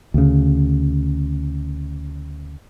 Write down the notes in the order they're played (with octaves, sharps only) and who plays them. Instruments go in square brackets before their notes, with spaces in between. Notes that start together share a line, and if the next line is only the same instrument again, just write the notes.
[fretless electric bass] D2 C#3